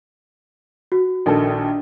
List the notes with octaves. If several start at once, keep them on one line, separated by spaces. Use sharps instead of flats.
F#4
A#1 D#3 A4